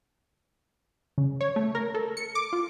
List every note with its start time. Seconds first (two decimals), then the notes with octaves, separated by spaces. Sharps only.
1.18 C#3
1.41 C#5
1.56 A3
1.75 A#4
1.94 A4
2.17 C#7
2.35 D6
2.53 F4